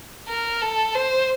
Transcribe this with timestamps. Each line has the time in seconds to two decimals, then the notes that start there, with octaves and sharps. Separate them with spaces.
0.28 A#4
0.62 A4
0.95 C5